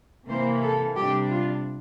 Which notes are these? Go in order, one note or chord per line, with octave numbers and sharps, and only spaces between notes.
C3 E3 A#3 C5
A4
C3 G3 D4 G4
F4